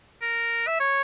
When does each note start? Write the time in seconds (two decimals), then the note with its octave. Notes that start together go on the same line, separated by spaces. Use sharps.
0.22 A#4
0.67 E5
0.80 C#5